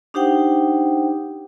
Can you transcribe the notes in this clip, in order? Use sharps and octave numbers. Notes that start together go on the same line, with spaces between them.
D4 D#4 G4 C5 F#5 G5